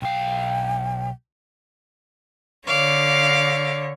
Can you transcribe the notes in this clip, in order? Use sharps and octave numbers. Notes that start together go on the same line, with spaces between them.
B1 F5 G5
D3 C#5 F5 D6